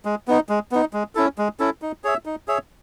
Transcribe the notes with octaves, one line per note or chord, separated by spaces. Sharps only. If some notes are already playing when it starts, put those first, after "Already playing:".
G#3
B3 D#4
G#3
B3 D#4
G#3
C#4 E4 A4
G#3
C#4 E4 A4
D#4
G#4 C#5 E5
D#4
G#4 C#5 E5